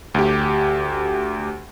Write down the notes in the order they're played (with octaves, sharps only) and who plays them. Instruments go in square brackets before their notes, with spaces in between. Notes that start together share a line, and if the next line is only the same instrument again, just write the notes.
[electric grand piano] D2 G4